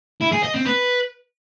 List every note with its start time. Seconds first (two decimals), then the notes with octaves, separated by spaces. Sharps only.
0.21 E4
0.32 G#4
0.43 D#5
0.54 C4
0.65 B4